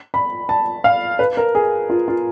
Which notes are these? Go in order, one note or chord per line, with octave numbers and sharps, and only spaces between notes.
B5
A5
F5
B4
A#4
G#4
F4
F4